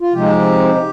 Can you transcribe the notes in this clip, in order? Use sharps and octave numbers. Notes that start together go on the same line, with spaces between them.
F4
C3 F3 G#3 C4 D#4 G4